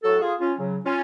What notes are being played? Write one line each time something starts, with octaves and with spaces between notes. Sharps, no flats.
A2 F#3 F#4 A4
F4 G#4
C#4 F4
C#3 F#3
C#4 F4